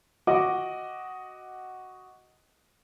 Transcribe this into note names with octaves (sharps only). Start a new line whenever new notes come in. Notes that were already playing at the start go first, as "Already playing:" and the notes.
F#4 D#5 F#5 D6